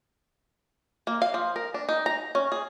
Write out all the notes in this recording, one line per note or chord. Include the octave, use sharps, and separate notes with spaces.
A#3
F5
F3
A#4
D4
D#4
A#5
C#4
G#4